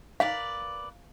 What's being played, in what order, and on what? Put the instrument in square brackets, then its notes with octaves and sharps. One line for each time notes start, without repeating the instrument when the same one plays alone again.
[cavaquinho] A#4 B4 D5 [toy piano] F5